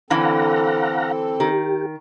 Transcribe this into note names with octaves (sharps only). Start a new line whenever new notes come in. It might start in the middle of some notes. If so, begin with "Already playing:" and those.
D3 E3 C4 A4 F5 F#5 A#5
D#3 G4